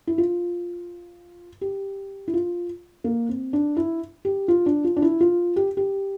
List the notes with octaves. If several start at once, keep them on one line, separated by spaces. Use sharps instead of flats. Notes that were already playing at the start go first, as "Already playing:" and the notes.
E4
F4
G4
E4
F4
A#3
C4
D4
E4
G4
F4
D4
F4
D4
E4
F4
G4
G4